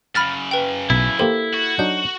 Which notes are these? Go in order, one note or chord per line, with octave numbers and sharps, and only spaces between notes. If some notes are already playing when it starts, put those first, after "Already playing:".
F#2 C#3 B5 F6 A6
B4 G5
B1 E4
A#3 G4 A4 C5
F#4
F#3 D4 D#4 G6